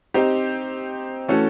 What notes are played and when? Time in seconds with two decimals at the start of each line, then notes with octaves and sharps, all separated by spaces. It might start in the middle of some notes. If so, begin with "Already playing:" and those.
0.14 C4 D#4 G4
1.28 E3 A3 C#4 F#4 A4